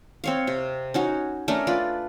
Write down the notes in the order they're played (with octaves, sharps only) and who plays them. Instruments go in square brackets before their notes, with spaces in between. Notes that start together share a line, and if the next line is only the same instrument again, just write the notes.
[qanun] C4 C#5 F5
C3
C#4 D#4 F#4
A3 C#4 D4 A#4
F4 B4 D5